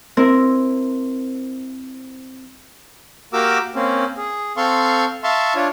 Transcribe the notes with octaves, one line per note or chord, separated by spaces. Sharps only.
C4 E4 A#4
A#3 F#4 G4 A#4 D6 E6
A#3 C4 C#4
G#4
C4 A4 F5 C6 C#6
E5 F5 A5 C6 C#6
D4 F4 C#5